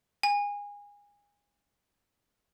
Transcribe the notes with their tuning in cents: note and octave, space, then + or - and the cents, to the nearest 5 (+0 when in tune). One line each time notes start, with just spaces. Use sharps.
G#5 -25